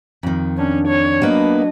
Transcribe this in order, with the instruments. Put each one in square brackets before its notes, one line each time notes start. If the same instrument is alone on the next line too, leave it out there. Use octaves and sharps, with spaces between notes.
[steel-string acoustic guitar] F2 D#3
[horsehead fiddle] C#4 [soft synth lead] D4
[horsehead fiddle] C#5
[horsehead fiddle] F#3 D#5 [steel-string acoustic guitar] A#3 B3 B4